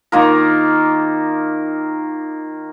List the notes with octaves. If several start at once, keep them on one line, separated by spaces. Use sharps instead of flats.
D#3 A#3 F4 A#4